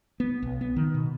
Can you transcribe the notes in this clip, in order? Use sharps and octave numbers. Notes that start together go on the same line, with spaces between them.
B3
B1
B3
D#3
B2